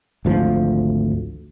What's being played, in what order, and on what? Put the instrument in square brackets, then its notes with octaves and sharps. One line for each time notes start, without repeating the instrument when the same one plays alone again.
[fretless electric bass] G#1 D2 F3